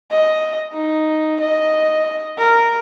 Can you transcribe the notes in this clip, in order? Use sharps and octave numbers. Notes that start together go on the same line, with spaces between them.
D#5
D#4
D#5
A#4